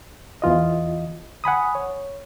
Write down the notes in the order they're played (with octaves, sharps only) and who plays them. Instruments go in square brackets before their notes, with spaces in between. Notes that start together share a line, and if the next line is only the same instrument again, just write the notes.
[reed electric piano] E2 E3 F4 D#5
F#5 G#5 B5 D#6
C#5